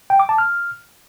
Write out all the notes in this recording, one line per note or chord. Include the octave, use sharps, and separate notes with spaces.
G5
D6
A5
F6